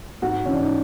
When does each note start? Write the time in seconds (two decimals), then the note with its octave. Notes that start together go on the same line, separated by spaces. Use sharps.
0.22 G#2 F#4
0.46 E3 C#4
0.54 D4
0.62 D#4